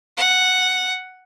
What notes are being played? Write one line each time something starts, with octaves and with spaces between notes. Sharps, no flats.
F#5